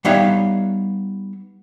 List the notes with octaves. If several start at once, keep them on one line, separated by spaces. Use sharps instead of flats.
G3 B3 D#4 C#5 E5 F5